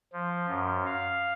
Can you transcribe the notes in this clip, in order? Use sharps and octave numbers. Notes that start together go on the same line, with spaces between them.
F3
F#2
F5